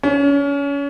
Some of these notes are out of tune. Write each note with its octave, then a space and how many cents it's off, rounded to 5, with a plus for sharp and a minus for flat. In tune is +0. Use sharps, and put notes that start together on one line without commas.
C#4 +30